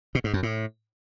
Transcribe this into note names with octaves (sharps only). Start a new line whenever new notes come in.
B2
G#2
F#2
A2